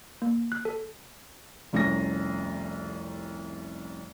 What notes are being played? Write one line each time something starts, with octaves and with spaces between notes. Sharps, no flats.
A#3
F#6
A4
F1 C2 C#4 A#6